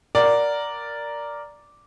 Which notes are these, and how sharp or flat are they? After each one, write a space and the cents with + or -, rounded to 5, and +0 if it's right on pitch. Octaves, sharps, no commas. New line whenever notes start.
A#4 +0 D5 -5 F#5 +0